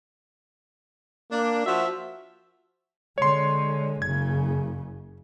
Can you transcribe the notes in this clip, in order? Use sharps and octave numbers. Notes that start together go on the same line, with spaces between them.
A#3 D4
F3 F#4 E5
D3 G#3 C#5 C6
F#1 C#3 G#6